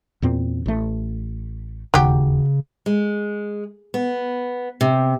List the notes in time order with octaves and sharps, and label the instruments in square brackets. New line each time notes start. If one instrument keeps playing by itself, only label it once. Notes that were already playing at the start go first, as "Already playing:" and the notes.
[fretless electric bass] E2 A#2 C4
A1 A3
[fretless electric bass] E1 D#2 [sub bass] C#3 [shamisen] F#3 G4
[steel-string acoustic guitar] G#3
B3
C3